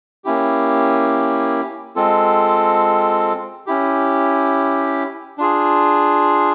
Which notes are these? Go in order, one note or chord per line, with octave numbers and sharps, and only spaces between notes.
A#3 C#4 E4 G4
G#3 C4 F4 A4
C#4 E4 G4
D4 F4 G#4